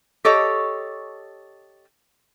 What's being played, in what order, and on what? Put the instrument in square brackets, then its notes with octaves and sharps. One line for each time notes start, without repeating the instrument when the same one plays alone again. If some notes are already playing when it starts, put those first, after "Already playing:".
[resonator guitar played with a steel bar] G4 A4 C#5 D#5